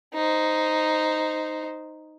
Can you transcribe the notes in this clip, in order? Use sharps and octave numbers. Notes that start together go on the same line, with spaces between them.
D#4 C5